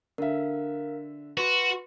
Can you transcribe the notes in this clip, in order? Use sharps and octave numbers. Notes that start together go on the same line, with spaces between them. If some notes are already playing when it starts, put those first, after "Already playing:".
D3 A#4 E5 F5
F#4 B4 C6